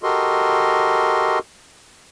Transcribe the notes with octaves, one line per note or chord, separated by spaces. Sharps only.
F#4 G4 A4 A#4 D#5 C6